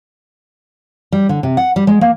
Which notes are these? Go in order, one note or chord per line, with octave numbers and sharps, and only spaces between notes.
G3
D3
C3
F#5
G3
G#3
A#3